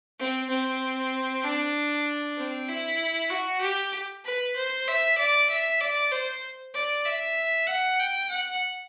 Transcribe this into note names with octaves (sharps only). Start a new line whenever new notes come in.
C4
C4
D4
C4
E4
F#4
G4
B4
C5
E5
D5
E5
D5
C5
D5
E5
F#5
G5
F#5